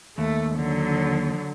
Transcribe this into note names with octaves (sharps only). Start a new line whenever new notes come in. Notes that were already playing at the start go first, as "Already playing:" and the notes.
D#2 A3
D3 F#3